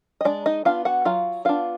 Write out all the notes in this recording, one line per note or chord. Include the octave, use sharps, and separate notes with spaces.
D#5
G#3 D4 D5
D#4 D#5
B3 D4 F4 F5
F#4 F#5
F#3 F4 F5
B3 D4 F4 F5